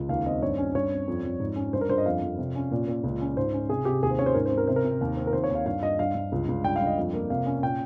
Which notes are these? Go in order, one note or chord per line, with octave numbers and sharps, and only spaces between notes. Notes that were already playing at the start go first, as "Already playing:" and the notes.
Already playing: C#2
D#2 F5
C4 D#5
G2 C#5
C#4
G2 C#5
C4
F2
F2
G#2
C#4
G2 C5
A#4
G2 C5
D#5
F2 F5
F2
C3
C#4
A#2
A#2
C#2
C#4
G#2 C5
C#4
C3 G#4
C3 G4
D#2 G#4
C5
C#4 C#5
C5
G#2 A#4
C5
C4
A#4
C3 C5
A#4
C3
D#2
C4
A#4
D#2 C5
C#5
D#2
F5
G2 F5
G2 D#5
G2 F5
G2
C#2
C#2
G2 G5
F5
G2
D#5
F2
A#3
C3 F5
C#4
A#2 G5